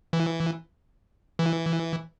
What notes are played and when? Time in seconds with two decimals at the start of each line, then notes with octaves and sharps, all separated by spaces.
0.13 E3
1.39 E3